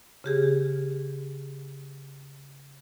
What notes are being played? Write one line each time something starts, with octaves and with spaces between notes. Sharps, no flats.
C#3 G4 G#4